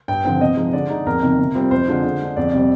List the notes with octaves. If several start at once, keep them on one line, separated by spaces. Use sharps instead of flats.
G2 G5
D3 F3 C4 G5
C3 D#5
F3 G#3 D#4
D3 D5
G#3 D#4
F2 A#4
C3 D#3
C3
G3 C4 F4
F2 C5
D3 G#3 D4 F4
D3
G#3 D4
F2 D5
C3 G3 C4